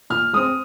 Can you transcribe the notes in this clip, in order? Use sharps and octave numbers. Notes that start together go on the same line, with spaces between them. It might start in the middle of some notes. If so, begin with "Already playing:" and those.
A#2 F6
G#3 C4 D#6